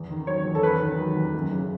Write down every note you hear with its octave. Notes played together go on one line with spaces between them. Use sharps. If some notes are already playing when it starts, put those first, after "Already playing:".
Already playing: E2
D#3
F#3 C#5
E2
A4
E2 B4
D#3
F#3
E2
F#2
C#3